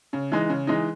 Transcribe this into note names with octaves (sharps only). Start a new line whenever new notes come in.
C#3
E3 G#3 D#4
C#3
E3 G#3 D#4